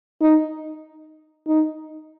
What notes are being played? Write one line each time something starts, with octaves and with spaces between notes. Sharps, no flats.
D#4
D#4